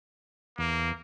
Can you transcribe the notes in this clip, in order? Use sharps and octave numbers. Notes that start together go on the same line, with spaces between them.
E2 A#3